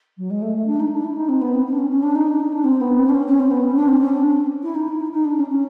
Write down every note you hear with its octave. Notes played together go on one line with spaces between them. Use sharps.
F#3
G#3
A3
A3
D4
D#4
D4
E4
D#4
C4
B3
C4
C4
D4
C#4
C#4
D4
D#4
D4
D#4
D4
C4
B3
C4
D4
C#4
C#4
C4
B3
C#4
D4
C4
C#4
D4
E4
D#4
E4
D#4
D#4
D4
C#4
C#4